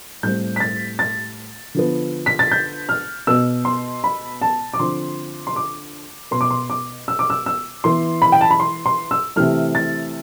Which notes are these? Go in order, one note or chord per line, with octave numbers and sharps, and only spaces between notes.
A2 G3 C4 G6
B6
A6
A6
D3 F3 B3
B6
A6
G6
F6
B2 B3 E6
C6
B5
A5
D6
D3 F3 C4 C6
C6
D6
B2 B3 C6
D6
C6
D6
E6
D6
E6
E6
E3 B3 C6
B5
G5
A5
B5
C6
C6
E6
C3 E3 A3 F6
A6